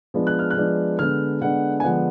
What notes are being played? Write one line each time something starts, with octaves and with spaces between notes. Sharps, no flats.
F3 G#3 B3 D4
F#6
F6
F#6
F3 G#3 B3 D4
D3 G#3 B3 D4 F6
D3 G#3 B3 D4 F#5
G#5
D3 F3 G#3 B3 D4 F#5